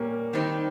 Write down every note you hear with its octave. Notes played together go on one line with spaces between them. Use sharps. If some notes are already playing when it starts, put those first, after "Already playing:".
Already playing: A#2 G3 A#3 C#4
D#3 G3 C4 D#4